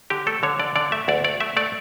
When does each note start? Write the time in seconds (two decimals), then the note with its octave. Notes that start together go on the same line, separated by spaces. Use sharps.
0.10 D3 G4
0.27 A3 A4
0.43 D3 C#5
0.59 D3 D5
0.76 D3 D5
0.92 A3 E5
1.08 D2 D5
1.24 A3 D5
1.40 A3 E5
1.57 A3 D5